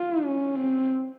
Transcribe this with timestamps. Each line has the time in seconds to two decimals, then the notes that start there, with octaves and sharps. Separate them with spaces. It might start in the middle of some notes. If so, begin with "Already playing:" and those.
Already playing: F4
0.24 C#4
0.55 C4